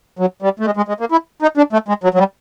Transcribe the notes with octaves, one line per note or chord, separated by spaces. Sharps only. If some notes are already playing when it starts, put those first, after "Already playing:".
F#3
G3
A3
G#3
G#3
G#3
A#3
E4
D#4
D4
A3
G#3
F#3
F#3
G3